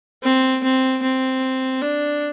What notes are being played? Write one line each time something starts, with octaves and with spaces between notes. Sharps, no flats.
C4
C4
C4
D4